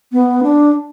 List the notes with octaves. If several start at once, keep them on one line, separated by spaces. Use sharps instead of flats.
B3
D4